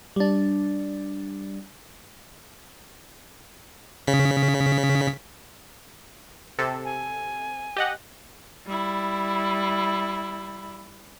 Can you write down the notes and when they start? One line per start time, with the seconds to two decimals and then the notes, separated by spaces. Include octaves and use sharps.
0.16 G3 D4
4.07 C#3 B6
6.59 C3 A4
6.85 G#5
7.76 G4 D#5 F#5
8.66 G3 E4